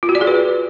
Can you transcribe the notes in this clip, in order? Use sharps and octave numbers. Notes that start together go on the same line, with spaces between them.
F4
F#4
D5
G#4
B4